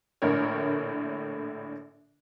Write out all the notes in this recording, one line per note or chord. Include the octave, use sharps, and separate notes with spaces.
A#1 A2 D3 A#4 C#5